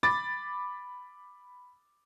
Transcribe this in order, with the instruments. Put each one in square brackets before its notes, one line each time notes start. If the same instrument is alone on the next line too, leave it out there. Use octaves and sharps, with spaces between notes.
[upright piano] B5 D6 A6